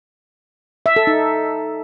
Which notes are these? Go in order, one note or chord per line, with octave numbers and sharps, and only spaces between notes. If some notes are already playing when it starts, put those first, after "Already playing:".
E5
A4
D#4